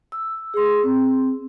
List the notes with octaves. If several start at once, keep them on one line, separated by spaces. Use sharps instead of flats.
E6
G#4 C6
C4